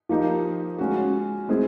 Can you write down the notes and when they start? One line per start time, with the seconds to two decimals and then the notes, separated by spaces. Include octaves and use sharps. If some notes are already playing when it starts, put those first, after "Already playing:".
0.09 F3 A#3 D#4 G4
0.78 G#3 C#4 F#4
1.49 G#3 C4 E4 G#4